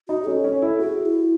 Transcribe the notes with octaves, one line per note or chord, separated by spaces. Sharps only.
D#4 F#4
C#4 A4
C#4
E4
F#4 G#4
E4